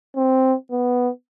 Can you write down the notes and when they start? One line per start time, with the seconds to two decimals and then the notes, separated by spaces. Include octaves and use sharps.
0.16 C4
0.71 B3